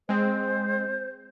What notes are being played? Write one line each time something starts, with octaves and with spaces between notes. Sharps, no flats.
G#3 C4 C5